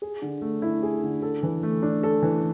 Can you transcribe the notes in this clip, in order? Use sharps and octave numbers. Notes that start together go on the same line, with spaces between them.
G#4
D3
A3
E4
G#4
D3
A4
E3
A3
D4
A4
E3